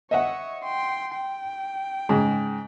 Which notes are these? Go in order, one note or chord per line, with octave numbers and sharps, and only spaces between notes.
C#5 D#5 E5 F#5
G5 C6
G5
G#2 C#3